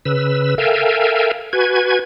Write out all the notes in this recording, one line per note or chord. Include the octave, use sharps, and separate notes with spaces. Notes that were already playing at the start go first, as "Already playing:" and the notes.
C#3 B4 E6
A4 A#4 E5 F5 G5 G#5
F#4 B4 G#5 G#6